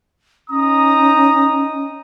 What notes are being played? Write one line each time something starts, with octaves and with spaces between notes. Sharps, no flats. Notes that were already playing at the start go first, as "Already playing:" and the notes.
C#4 D#4 A#5 D#6